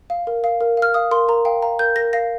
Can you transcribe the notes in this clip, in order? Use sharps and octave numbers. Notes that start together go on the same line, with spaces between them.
F5
A#4
F5
A#4
F5
F6
F5 D#6
A#4 C6
A#4 A#5
F5 G5
F5 A#5
A#4 G6
A#4 A#6
F5 A#6